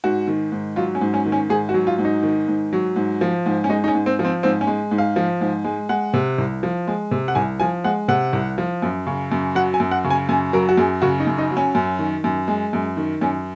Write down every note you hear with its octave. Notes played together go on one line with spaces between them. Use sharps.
G#2 F#4
D#3
G#2
F#3 F4
C#4
G#2
C#4
D#3
C#4
G#2 G#4
F#4
F#3
F4
G#2
D#4
D#3
G#2
F#3
G#2
F3
G#2
C#4
G#3 D#4
D#4
C#4
G#2
C4
F3
C4
G#2 C4
C#4
G#3
G#2
F5
F3
G#2
G#3
G#3 F#5
C3
C2
F3
G#3
C3
F#5
C2 G#5
F3 G#5
G#3 F#5
C3 F#5
C2
F3
F#2
C#3
F#2
F#3 F#5
G#5
F#2
F#5
C#3
G#5
F#2 G#5
F#3 A#4
F#4
F#2 G#4
C#3 F#4
D#4
F#2
D#4
F#3
C#4
F#2
D#3
F#2
G#3
F#2
D#3
F#2 C#4